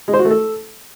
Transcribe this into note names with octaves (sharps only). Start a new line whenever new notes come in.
G#3
C5
F#4
A3
A4